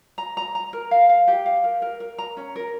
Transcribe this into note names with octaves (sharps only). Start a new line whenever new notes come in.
A#5
A#5
A#5
A#4
F5
F5
G4
F5
A#4
A#4
A#4
A#5
C#4
A#4